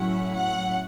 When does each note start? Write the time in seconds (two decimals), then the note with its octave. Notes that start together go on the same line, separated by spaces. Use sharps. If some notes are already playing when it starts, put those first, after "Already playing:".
Already playing: A2 F#3 A3 C#4 E4 F#5
0.35 F#5